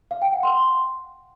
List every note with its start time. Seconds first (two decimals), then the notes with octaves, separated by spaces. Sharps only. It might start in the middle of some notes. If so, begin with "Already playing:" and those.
0.11 F5
0.22 G5
0.32 F#5
0.43 C6